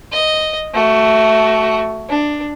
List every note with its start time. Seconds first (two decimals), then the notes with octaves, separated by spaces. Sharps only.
0.13 D#5
0.74 A3 F#4
2.10 D4